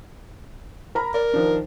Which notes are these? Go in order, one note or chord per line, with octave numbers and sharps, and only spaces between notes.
A#4 A#5 B5
A#4 D5
D#3 F3 D4